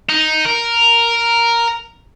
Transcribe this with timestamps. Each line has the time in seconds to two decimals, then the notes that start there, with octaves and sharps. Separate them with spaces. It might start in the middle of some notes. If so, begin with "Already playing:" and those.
0.09 D#4
0.45 A#4